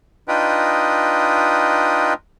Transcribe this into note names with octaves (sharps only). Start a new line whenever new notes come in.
D4 D#4 F4 B4 D#5 G5